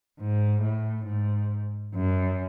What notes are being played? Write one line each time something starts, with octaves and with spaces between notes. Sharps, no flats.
G#2
A2
G#2
F#2